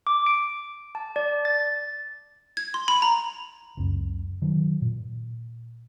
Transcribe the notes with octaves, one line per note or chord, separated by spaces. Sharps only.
D6
D7
A5
D5
A6
G#6
C6
B5
A#5
F#1 C#2 C#3
D#3 F#3
A#2